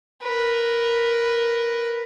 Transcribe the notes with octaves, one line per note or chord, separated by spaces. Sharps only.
A#4 B4